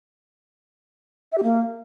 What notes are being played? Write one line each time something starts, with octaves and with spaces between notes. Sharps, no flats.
E5
G4
A#3